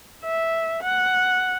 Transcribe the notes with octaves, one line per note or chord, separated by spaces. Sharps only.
E5
F#5